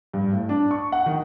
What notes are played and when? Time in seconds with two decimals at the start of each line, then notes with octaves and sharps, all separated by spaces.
0.14 G2
0.33 A2
0.49 D4
0.71 C#6
0.92 F#5
1.06 D#3